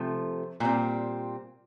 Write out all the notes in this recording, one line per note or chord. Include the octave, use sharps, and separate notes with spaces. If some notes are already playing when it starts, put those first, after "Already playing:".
Already playing: C3 F3 A3
A#2 G3 C4